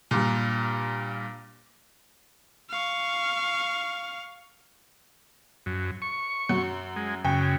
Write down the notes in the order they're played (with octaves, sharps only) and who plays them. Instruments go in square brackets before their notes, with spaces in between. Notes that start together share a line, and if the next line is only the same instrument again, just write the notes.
[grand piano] G2 A#2
[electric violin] F5 C#6
[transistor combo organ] F#2
C#6
[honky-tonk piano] F#2 F#4
[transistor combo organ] G#3
[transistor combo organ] F#2 C#3 [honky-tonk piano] G5